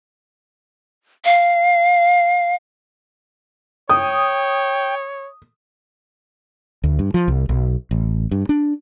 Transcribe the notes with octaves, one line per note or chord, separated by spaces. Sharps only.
F5
C#5 G5 D#6
D2
G2
F3
C2
B1
A1
G2
D4